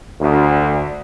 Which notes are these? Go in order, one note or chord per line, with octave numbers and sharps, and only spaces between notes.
D2